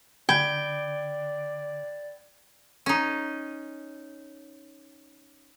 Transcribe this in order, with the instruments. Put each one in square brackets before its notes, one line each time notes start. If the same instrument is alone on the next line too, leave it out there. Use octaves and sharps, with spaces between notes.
[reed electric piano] D3 [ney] D5 [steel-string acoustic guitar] G5 [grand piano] B5 G#6
[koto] C#4 D#4